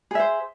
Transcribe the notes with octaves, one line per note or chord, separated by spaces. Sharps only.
G#4 C5 E5